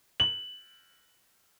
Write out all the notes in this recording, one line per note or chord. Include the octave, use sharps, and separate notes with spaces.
F#7